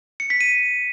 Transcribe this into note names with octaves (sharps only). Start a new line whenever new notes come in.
C#7
B6
D#7